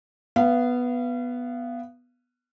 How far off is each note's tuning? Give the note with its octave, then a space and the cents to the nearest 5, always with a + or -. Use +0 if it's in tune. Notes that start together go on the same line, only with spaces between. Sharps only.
B3 +0 F5 -35